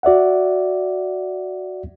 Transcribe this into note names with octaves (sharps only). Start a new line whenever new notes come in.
F#4 D5 E5 F#5